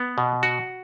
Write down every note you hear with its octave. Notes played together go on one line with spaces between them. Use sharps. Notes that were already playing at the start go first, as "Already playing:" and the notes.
Already playing: B3
B2
F#4